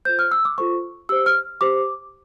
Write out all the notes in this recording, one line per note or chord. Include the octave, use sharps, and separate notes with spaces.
F4 A4 C5 G6
F6
E6
D6
F4 A4 C5 C#6
G4 C5 E6
F6
G4 C5 D6